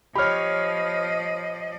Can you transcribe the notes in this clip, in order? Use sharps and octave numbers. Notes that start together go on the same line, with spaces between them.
F3 G4 C#5 D#5 B5 F6